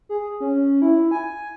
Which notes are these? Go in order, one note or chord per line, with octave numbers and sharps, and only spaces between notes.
G#4
C#4
E4
G#5